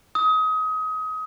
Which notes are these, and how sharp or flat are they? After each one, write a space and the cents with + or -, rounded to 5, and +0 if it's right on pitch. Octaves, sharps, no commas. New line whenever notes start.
D#6 +25